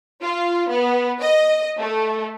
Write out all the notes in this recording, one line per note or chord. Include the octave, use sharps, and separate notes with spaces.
F4
B3
D#5
A3